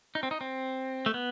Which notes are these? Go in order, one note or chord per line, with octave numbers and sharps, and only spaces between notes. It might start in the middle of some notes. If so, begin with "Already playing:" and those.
D#4
C4
D#4
C4
A3
B3